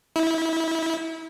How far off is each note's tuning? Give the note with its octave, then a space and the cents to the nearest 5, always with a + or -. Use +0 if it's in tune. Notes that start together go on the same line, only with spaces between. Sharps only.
E4 -25